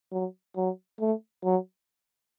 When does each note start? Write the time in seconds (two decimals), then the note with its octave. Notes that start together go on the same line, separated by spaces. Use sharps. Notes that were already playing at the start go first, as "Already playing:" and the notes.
0.12 F#3
0.56 F#3
0.99 A3
1.43 F#3